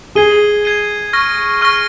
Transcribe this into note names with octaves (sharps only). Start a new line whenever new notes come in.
G#4 G#6 C7 D#7 G7
G#6 C7 D#7 G7
C#6 F6 A#6
C#6 F6 A#6